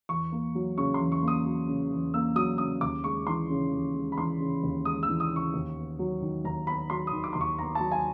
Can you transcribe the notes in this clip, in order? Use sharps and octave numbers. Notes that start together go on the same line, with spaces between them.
E2 C#6
A#3
F#3
C#3 C#6
E2 C6
C#6
A#3
D#6
F#3
C#3
E2
A#3 E6
F#3 D#6
C#3 D#6
D#2 D6
G#3 C#6
E3 C6
C#3
D#2
G#3
B5
E3 C6
C#3
D#2
G#3 D#6
E6
E3
D#6
C#3 C#6
D#2
B3
F#3
D#3
D#2 A#5
B3 B5
F#3 C6
D#6
D#3
D6
D#2 C6
C#6
B3 A#5
F#3 A5
G#5